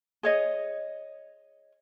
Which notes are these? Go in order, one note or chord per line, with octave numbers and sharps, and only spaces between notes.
G#4 C#5 D#5